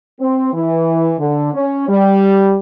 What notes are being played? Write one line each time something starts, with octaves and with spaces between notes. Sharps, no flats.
C4
E3
D3
C#4
G3